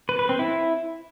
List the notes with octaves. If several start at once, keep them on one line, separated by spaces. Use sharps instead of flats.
B4
B4
C4
E4